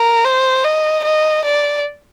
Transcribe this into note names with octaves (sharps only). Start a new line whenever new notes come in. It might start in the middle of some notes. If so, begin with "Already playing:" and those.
Already playing: A#4
C5
D#5
D#5
D5